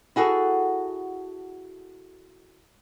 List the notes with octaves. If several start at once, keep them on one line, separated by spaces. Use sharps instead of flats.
E4 F#4 G#4 A4